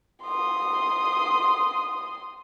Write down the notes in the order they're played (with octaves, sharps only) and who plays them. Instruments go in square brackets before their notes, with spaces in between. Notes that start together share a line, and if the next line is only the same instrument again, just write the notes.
[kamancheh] C6 D#6